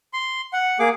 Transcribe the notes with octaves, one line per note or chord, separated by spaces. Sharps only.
C6
F#5
A#3 G#4 D6